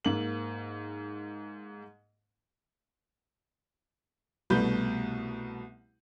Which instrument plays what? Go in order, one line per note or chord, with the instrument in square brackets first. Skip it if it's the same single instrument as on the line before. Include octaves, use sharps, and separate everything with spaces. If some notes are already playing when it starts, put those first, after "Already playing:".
[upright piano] G#2 A#3 F#7
[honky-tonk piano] C2 B2 A3 B4 B5 G6